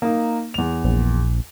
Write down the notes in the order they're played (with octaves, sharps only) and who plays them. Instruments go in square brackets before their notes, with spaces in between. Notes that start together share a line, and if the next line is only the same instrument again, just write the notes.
[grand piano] A#3 D#4
E2 F7
[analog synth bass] A#1